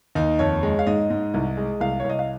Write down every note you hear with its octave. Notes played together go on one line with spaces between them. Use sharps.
D#2 D#4
F2 C#5
G#3
F5
G#2 D#5
G#2
C2
G#3
C2 F5
C#5
C2
D#5
F5